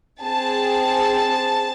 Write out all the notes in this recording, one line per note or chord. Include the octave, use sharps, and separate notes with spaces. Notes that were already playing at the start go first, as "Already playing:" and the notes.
C4 G#4 A5